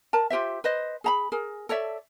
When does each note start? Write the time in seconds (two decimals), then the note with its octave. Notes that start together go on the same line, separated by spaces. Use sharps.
0.13 A#4 A5
0.30 F4 G4 C5 E5
0.64 B4 C5 D#5
1.04 G#4 A#5 B5
1.32 G#4 A#4
1.69 A4 C#5 D5 E5